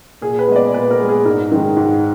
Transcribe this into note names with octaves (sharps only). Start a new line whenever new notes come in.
A#2 G#4
B4
G#3 B3 D#5
D5
A#2 B4
A#4
G#3 B3
G#4
G#2 A#4
D#3 G#3
G#2